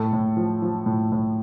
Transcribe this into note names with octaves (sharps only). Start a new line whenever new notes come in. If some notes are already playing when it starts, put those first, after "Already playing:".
Already playing: A2 A4
A2
F3
F3
A2
A2